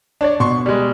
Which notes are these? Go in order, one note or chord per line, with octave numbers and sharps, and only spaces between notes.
D4 C#5 D5
B2 C6 C#6
G3 G#3